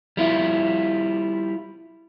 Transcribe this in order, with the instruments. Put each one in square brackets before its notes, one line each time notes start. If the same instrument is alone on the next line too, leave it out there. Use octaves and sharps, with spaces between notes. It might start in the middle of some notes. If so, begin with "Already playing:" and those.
[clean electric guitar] G3 E4 F4